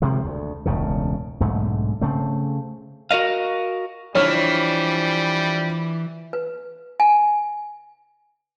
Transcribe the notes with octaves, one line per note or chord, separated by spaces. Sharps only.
C3 D#3 F3 G#3
D2
E1 C#2 A2 C#3
B1 G#2 D3 A3
C#3 A3 C4
F#4 A#4 D#5 F5
E3 F3 G3 D4 C#5 F6
B4
G#5